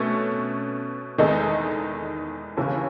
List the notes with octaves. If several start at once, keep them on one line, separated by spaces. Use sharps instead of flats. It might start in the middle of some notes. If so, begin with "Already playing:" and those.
Already playing: B2 A3 C#4
E2 D#3 G#3 D#4 A4
D#2 C#3 E3